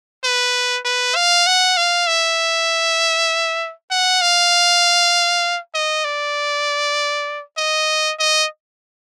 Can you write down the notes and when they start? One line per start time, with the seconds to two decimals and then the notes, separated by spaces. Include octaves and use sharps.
0.24 B4
0.85 B4
1.16 F5
1.46 F#5
1.77 F5
2.07 E5
3.91 F#5
4.22 F5
5.74 D#5
6.05 D5
7.58 D#5
8.19 D#5